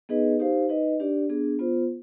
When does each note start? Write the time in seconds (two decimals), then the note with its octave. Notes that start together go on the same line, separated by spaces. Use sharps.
0.09 B3 D#4 G#4 B4 D#5
0.39 D#4 G4 C5 F5
0.69 D#4 B4 D#5
1.00 D4 G4 D5
1.30 B3 D4 G#4
1.59 B3 F4 C5